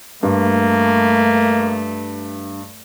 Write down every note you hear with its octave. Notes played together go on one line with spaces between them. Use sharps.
G2 A3 A#3